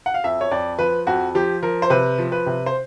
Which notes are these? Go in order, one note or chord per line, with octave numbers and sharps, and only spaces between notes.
F#5
F5
F2 E5
C#5
F2 D5
F3 B4
F2 F#4
F3 G4
F3 A#4
C5
C3 B4
F3
B4
C3
C5